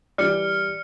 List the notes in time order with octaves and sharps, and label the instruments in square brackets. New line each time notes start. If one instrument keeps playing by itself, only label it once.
[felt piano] E3 G3 [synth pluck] D5 [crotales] F6 C#7